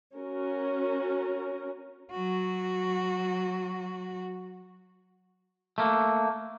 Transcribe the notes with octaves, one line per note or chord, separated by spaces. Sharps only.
C#4 F#4 A#4
F#3 F#4
A3 A#3